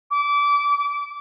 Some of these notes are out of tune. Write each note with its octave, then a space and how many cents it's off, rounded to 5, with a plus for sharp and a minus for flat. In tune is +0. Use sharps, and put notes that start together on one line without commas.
D6 -25